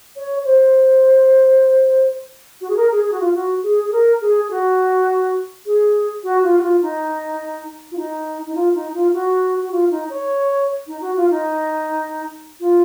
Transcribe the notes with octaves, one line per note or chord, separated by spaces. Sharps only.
C#5
C5
F#4
G#4
A#4
G#4
G#4
F#4
F4
F#4
G#4
G#4
A#4
G#4
G#4
F#4
G#4
F#4
F4
F#4
F4
D#4
F4
D#4
D#4
F4
D#4
F4
F#4
F#4
F4
D#4
C#5
D#4
F#4
F4
D#4
F4